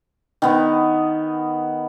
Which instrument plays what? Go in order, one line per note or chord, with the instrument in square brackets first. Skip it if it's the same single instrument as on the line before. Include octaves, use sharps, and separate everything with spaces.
[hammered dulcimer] D#3 B3